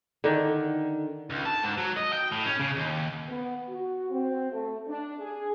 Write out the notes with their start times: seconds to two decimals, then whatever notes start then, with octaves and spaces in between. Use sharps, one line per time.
0.24 D3 D#3
1.30 C#2
1.46 A5
1.64 G#2
1.78 F#3
1.97 D#5
2.13 G5
2.32 A2
2.46 C#4
2.60 C#3
2.76 D#2
3.28 B3
3.69 F#4
4.11 C4
4.51 A3
4.87 D4
5.19 G#4